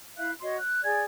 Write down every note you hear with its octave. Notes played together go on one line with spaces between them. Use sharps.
E4 E5 F5 F#6
F#4 C#5 D#5 C6
F#6
G#4 D5 G#5 G#6